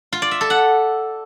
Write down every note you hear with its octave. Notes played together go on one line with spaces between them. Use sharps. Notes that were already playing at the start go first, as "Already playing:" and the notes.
F4
D5
E5
A4
F#5